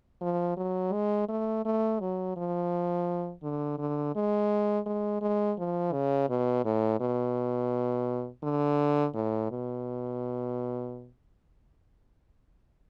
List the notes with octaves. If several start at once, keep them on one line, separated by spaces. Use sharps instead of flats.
F3
F#3
G#3
A3
A3
F#3
F3
D3
D3
G#3
G#3
G#3
F3
C#3
B2
A2
B2
D3
A2
B2